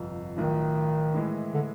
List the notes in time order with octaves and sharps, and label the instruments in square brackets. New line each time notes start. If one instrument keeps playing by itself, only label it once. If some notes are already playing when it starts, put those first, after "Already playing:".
Already playing: [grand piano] G1 F2 C3
[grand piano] B1 A2 F3 [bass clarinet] D#3
[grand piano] A2 E3 G#3
[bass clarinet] D3